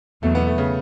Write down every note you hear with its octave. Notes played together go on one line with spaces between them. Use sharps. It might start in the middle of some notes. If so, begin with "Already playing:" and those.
E2 B2 F#3 A3
B3
A3
C#3